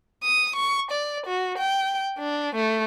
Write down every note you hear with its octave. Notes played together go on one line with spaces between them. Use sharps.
D#6
C#6
D5
F#4
G5
D4
A3